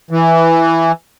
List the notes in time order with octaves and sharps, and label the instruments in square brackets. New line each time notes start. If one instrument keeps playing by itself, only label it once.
[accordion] E3